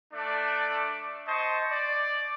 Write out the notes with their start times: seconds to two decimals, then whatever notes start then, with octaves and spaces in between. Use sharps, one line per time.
0.13 A3 D4 D5
1.27 C5 D#5 A5 C#6
1.70 D5